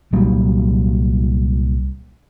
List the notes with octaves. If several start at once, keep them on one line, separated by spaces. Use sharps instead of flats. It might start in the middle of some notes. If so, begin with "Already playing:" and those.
C2 A#2 F#3 G3